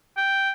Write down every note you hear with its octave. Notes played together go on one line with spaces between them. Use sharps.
G5